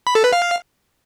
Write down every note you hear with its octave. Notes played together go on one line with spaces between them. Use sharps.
B5
A4
B4
F5